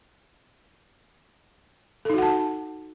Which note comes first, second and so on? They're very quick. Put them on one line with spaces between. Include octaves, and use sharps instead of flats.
A4 D#4 F#4 F#5 A5